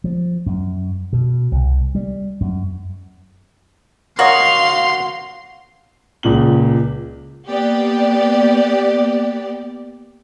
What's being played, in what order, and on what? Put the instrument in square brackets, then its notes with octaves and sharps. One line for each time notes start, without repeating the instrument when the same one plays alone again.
[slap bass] F3
F#2
B2
C2
G3
F#2
[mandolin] F#4 [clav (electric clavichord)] A#4 C#5 D#5 [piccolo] F5 [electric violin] C6
[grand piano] C#2 A#2 F#7
[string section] A#3 B3 G4 D5